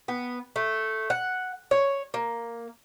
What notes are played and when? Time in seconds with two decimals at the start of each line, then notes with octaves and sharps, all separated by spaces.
0.08 B3
0.56 A3
1.10 F#5
1.71 C#5
2.14 A#3